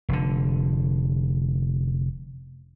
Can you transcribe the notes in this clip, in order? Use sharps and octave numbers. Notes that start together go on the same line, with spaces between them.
F1 D3